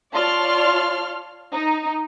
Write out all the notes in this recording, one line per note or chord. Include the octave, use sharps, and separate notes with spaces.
F4 C#5 D5 A5 C6 F6
D#4